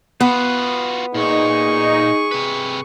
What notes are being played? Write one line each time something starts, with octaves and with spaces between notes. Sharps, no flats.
B3 F4 F#4
A#2 D#4 G#4 C#6
C3 B4